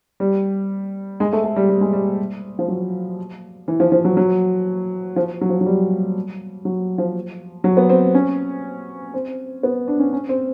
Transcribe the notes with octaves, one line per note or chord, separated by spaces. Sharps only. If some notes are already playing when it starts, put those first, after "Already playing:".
G3
G#3
A3
A3
G3
G3
G#3
G3
F3
F#3
E3
F3
F3
F#3
F#3
F3
F#3
F3
F#3
G3
F#3
F3
F#3
B3
C4
C#4
C4
B3
D4
C#4
C#4
C4